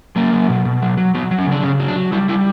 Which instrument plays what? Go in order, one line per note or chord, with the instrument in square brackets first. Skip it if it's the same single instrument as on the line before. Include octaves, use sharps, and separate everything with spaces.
[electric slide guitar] F#3 A#3
F#3
B2
B2
F#3
F#3
F#3 B3
F#3
C#4
C#3 D4
C#3 C#4
F#3
D4
F#3
G3 E4
G3 E4